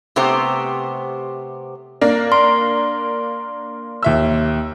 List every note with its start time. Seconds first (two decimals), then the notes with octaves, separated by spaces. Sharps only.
0.16 C3 A3 B3 G4 C5
2.01 A#3 D4
2.32 A#4 C6
4.03 D#2 E5 E6